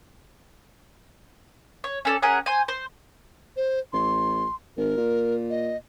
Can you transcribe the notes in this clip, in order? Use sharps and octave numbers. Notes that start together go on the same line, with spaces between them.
C#5
C#4 A4 D5
C#4 G#4 A#4 F#5
C5 G#5
C5
C5
A1 C6
G#1 A#4
A#2
D#5